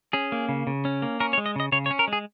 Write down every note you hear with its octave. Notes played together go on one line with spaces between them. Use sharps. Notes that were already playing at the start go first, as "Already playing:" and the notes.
C#4 G#4
A#3
C#3
C#3
C#4
A#3
C#4 A#4
C#5
G#3
D#5
C#3 D#5
C#3 C#5
C#5
C#4
A#4
G#3
G#4